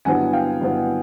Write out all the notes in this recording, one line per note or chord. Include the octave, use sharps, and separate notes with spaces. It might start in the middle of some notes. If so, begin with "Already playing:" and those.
G2 D3 F#3 B3 E4 F#5 G#5
F5 G5
G2 D3 F#3 B3 E4